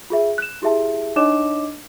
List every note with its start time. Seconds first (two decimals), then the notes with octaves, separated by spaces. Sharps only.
0.10 F4 G#4 E5
0.38 F#6 E7
0.62 E4 G4 G#4 E5 A5
1.16 D4 D#4 C#5 D#5 D6 E7